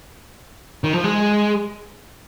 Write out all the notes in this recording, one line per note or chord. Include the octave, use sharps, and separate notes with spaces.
D#3
F3
G#3